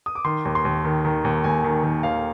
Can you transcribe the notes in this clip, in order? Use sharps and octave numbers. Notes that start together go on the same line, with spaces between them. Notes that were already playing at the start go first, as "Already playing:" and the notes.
D#6
D6
D#3 C6
D#2
C6
D#2
D#3
D#3
D#2
D#2 G#5
D#3
D#3
D#2 F5